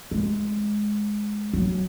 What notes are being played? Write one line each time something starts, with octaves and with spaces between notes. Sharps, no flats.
G#3
F#3